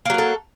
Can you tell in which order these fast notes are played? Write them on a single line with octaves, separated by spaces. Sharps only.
A#3 F#3 A#4 A4